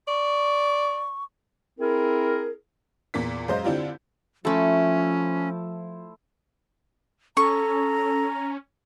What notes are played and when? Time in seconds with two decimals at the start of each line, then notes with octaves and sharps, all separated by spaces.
0.08 D5 C#6
1.80 C4 E4 G#4 A#4
3.14 E2 A#2 A#3 B6
3.48 F#2 G#3 C5 D#5 F5 G6
3.64 D3 C4 D4 E4 F4 G4
4.45 F3 A3 C#4 E4 A4 C5 A5
7.37 C#4 A4 A#5 C#6